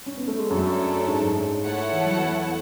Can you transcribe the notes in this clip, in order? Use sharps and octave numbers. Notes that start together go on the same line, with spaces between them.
C#4
B3
A3
G#3
F#2 F#3 A3 D4 A4 C#5
G#2 G#3
A3 E4 A4 C#5 F#5
E3
F#3
E2 E3